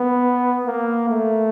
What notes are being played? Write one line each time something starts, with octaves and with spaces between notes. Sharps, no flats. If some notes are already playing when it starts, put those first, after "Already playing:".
Already playing: B3
A#3
A3